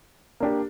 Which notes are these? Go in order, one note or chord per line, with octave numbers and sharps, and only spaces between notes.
A#3 D4 G4